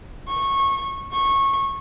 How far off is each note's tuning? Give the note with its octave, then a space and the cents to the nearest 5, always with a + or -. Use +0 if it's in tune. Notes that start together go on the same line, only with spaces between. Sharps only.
C#6 -20
C#6 -20